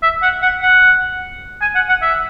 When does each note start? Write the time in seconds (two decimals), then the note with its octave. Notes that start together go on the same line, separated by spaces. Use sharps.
0.03 E5
0.22 F#5
0.42 F#5
0.63 F#5
1.62 G#5
1.75 F#5
1.89 F#5
2.02 E5